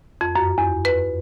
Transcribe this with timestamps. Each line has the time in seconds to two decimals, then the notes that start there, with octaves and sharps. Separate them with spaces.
0.21 F2
0.36 F#2
0.58 E2
0.85 B4